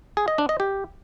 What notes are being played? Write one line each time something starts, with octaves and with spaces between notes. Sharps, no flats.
G#4
D#5
D4
D#5
G4